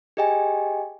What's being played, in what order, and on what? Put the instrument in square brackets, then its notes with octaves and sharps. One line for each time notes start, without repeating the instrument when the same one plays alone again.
[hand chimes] G4 G#4 D#5 G5 G#5